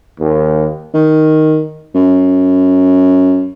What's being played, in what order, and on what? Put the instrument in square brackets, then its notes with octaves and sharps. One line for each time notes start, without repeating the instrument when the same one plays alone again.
[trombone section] D#2
[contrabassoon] D#3
F#2